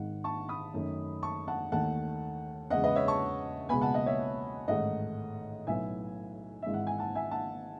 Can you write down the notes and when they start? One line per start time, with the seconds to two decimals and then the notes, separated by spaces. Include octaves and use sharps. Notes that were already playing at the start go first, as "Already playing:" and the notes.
Already playing: G#1 G#2 D#3 G#3 F#5
0.24 A5 C#6
0.48 B5 D#6
0.74 F#2 D#3 A3
1.23 A5 C#6
1.48 F#5 A5
1.72 D#2 D#3 A3 F#5 A5
2.70 E2 C#3 G#3 D#5 F#5
2.84 B4 D#5
2.95 C#5 E5
3.08 A5 C#6
3.69 C#2 B2 G#3 B3 G#5 B5
3.81 F#5 A5
3.94 D#5 F#5
4.06 C#5 E5
4.68 A1 G#2 D#3 A3 D#5 F#5
5.67 B1 A2 F#3 B3 E5 G#5
6.62 G#1 G#2 E3 G#3 E5
6.74 F#5
6.87 G#5
6.98 F#5 A5
7.15 E5 G#5
7.31 F#5 A5